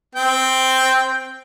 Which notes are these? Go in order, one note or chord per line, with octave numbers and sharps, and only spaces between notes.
C4 G5